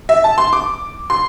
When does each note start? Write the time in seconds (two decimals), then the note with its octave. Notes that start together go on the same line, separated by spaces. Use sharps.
0.09 E5
0.24 A5
0.38 C6
0.53 D6
1.10 C6